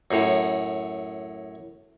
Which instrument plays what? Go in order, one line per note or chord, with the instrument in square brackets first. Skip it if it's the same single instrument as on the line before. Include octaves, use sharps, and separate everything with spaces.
[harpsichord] F#2 A2